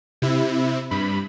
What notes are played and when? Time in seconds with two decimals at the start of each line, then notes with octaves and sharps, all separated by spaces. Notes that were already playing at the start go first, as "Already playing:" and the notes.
0.22 C3 E4
0.91 G2 B5